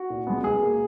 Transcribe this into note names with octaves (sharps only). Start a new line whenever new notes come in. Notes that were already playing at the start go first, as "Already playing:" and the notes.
Already playing: F#4
A#2
G#3 B3
B2 G#4
A#3